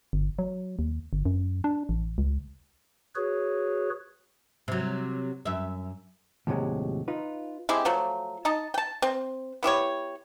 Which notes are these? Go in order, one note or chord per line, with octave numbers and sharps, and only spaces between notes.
G1
F#3
D#2
G1
F#2
D4
A1
C#2
F#4 G#4 B4 C#5
C3 F#3
F#2 E5
D#2 A2 C3 F#3 G#3
D#4 F4 B4
G#3 C4 E4 G4
F3 F#3 A3
D#4 D#5 A5
G5 A5
C4
B3 E4 G4 C#5